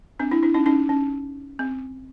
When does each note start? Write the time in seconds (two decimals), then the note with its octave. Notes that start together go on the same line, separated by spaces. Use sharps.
0.20 C4 D4
0.31 D4 E4
0.43 D4 E4
0.54 C#4 D#4
0.66 C#4 D#4
0.89 C#4
1.59 C4